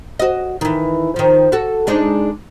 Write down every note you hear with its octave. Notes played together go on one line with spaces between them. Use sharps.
F#4 D#5
D#3 E3
D#3 F3
F#4 A4
G#3 D4 D#4